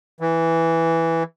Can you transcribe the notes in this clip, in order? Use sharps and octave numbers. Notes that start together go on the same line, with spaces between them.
E3